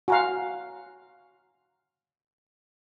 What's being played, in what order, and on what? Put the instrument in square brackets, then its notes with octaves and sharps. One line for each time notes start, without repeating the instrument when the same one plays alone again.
[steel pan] F#4 F5 [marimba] G#5 A#5 C6